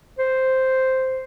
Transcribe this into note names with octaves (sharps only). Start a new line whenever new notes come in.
C5